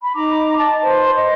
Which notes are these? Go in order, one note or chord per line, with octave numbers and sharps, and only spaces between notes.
B5
D#4 A#5 D6
D#5 A5
B4 C5
D#5